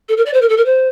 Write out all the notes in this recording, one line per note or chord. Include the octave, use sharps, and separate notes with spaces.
A4
A#4
D5
C5
A#4
A4
A#4
C5